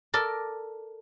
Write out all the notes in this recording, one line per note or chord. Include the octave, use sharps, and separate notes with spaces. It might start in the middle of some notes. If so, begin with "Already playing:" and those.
A4 A#4 D5